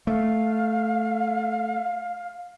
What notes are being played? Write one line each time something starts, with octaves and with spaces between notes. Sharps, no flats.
A3 F5